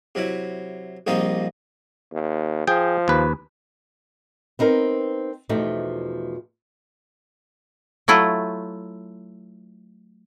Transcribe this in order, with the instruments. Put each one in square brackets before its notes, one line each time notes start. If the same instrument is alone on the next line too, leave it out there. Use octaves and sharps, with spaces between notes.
[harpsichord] C3 F#3 E4
A#1 F3 G3 C4 D#4 D#5
[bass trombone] D#2
[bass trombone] F3 [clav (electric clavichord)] G#4 G5
[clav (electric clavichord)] D#2 B4
[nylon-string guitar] B3 C4 D#4 A#4
E2 B2 F3 A3 D#4 G4
[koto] F#3 A3 E4 F4